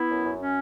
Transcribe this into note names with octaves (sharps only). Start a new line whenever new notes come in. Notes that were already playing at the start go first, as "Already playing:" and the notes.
Already playing: B3 E4
F#2
F#2
C#4